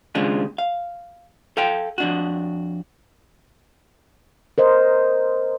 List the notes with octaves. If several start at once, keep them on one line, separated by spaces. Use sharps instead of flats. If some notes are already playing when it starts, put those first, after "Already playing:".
D#2 C#3 G#3 C4 D4 F4
F5
A4 F5 G5
F2 D4 F#4
A#4 C5 D#5